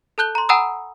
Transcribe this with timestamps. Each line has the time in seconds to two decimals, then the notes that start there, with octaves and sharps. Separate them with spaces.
0.18 A4 A5 F#6 G6 G7
0.35 A#5 C6
0.49 F#5 G#5 A#5 B5 D#6 E6